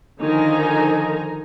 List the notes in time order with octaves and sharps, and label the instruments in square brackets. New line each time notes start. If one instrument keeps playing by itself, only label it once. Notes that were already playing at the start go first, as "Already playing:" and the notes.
[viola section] D3 D#3 F3 D#4 G#5 A#5